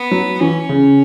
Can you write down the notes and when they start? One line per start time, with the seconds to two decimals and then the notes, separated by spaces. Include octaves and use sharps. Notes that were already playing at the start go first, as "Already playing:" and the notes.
Already playing: B3
0.11 F#3
0.40 E3 C#4
0.69 C#3